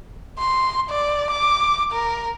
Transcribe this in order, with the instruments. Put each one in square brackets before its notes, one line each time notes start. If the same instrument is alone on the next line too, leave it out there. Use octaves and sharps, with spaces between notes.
[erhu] C6
D5
D6
A#4